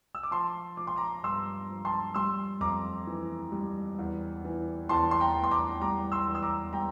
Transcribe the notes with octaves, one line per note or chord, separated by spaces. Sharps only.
E6
D6
F3 A5 C6
F3 D6
C6
A#5 D6
G2 C6 E6
F3
A5 C6
G3 C6 E6
F2 A#5 D6
E3
G3
E2
E3
E2 A5 C6
C6
G5 A#5
E2
C6
A#5 D6
G3 A#5 D6
C6 E6
E2
E6
A#5 D6
G3 G5 A#5